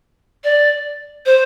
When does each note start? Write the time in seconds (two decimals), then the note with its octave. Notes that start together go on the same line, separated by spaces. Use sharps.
0.44 D5
1.26 C5